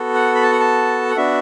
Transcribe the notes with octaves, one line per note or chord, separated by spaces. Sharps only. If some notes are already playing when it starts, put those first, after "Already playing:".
Already playing: B3 F#4 A4
F#5
B5
A5
F#5
A5
F#5
B3 D4 F#4 E5